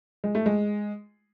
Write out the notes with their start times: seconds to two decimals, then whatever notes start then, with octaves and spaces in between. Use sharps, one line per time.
0.24 G#3
0.35 A3
0.46 G#3